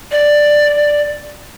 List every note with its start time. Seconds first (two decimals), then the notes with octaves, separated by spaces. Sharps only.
0.12 D5